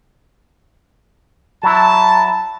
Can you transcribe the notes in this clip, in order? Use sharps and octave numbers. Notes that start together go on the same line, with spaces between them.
F#3 E4 A5